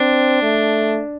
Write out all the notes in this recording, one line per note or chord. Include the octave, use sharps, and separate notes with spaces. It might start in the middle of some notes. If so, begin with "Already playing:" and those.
Already playing: C4 D4
A3